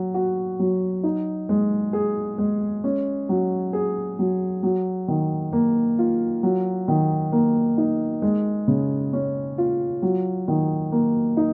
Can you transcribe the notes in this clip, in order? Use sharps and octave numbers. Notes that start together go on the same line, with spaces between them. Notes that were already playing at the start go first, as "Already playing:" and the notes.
Already playing: F#3
F#4
F#3
D#4
G#3
G#4
G#3
C#4
F#3
G#4
F#3
F#3
D#3
A#3
F4
F#3
D#3
A#3
D#4
G#3
C#3
C#4
F4
F#3
D#3
A#3
D#4